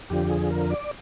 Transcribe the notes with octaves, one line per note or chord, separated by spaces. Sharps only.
F2 D3 F3 G4
G#4
A#4
D5